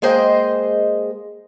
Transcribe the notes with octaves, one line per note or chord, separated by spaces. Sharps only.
G#3 A#3 G#4 C5 D#5 G5